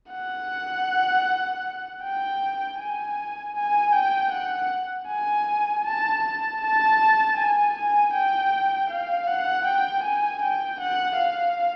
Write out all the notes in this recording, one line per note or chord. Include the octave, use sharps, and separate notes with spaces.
F#5
G5
G#5
G#5
G5
F#5
G#5
A5
A5
A5
G#5
G#5
G5
F5
F#5
G5
G#5
G5
F#5
F5